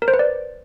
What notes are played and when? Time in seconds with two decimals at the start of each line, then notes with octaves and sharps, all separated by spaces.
0.02 A#4
0.08 C5
0.14 B4
0.19 D5